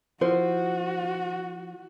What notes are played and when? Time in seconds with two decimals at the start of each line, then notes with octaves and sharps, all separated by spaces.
0.21 F3 E4 F#4 C5